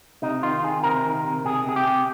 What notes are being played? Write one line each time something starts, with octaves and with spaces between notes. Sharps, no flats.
C3 D#4
D#3 F4
D#3 G#4
C3 A#4
D#3
C3
C3 G#4
C3 G#4
G4
C3